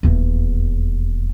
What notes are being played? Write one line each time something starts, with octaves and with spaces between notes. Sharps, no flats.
D#1 E2